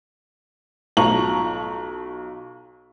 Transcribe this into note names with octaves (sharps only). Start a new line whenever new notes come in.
B1 F4 A5 A#5 C#6 F#7